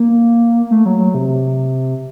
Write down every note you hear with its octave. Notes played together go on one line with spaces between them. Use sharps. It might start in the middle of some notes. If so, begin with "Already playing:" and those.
Already playing: A#3
A3
F#3
F#3
C3